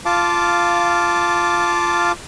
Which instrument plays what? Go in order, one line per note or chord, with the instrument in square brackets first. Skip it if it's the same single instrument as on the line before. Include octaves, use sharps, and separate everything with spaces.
[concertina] F4 F5 A5 D6